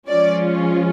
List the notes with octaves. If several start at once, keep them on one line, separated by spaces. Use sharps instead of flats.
F3 G#3 C#4 F4 D5